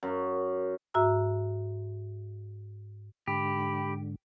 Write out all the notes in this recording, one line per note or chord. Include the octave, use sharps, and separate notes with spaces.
F#2
G#2 F#4 E5 A#5 E6
G#2 D3 G4 B5